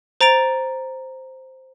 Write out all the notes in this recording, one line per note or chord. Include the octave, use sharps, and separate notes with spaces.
C5 A#5 A6 D7 F7